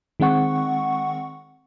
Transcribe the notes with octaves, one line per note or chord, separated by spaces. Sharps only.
D#3 G#3 C4 F#5 C#6